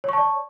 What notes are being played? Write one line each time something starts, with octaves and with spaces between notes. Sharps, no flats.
C#5 D5 A5 C#6